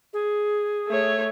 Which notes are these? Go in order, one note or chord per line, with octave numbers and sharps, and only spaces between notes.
G#4
A3 C#5